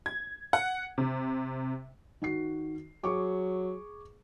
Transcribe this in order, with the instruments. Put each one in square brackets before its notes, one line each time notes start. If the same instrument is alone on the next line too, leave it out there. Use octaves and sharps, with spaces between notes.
[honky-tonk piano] G#6
F#5
C3
[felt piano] D#3 F#4 C7
[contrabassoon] F#3 [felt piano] G#4 C#6 D6